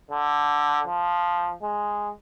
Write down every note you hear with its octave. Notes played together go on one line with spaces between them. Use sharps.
D3
F3
G#3